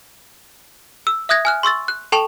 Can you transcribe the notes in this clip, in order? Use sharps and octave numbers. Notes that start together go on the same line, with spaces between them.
E6
E5 D#6 F#6 G#6 A#6
G#5 F6 F#6
C6 C#6 E6 A6
F#6
A4 G5 A5 C#6 E7 F7